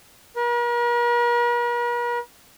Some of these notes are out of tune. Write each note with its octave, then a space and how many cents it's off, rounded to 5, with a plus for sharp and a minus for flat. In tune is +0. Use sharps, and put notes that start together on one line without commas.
A#4 +45